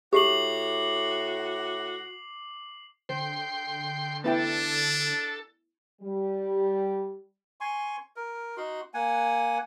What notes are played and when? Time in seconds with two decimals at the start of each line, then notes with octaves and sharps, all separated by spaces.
0.13 A2 F#4 G4 D6 C7 F#7
3.09 D3 C5 G5 C6
4.24 B3 D4 E4 A4 G5
6.02 G3
7.61 G#5 C6 C#6
8.16 A#4
8.57 D#4 F#4 C6
8.94 A#3 F#5 G#5